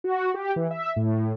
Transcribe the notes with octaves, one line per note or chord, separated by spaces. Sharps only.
F#4
G4
E3
E5
A2